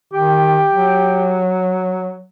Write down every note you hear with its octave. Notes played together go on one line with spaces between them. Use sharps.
D#3 G4
F#3